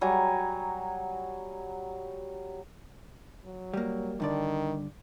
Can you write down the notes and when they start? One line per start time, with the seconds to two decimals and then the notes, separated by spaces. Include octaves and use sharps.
0.01 F#3 G3 G#5 A#5
3.45 F#3
3.73 G3 A#3
4.20 G2 D3 D#3 D5